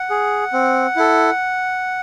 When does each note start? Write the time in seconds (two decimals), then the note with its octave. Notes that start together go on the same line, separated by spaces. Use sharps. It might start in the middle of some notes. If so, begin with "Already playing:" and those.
Already playing: F#5
0.10 G#4
0.53 C4
0.96 E4 A4